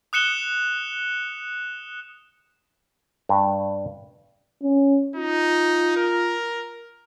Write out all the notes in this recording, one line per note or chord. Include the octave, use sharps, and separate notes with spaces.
D#6 F#6 C#7 E7 G7
G2
C#4
D#4 F4
A#4